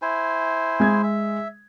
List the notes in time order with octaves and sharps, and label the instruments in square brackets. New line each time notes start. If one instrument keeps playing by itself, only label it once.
[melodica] E4 C5 G#5
[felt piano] G#3 G#6
[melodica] E5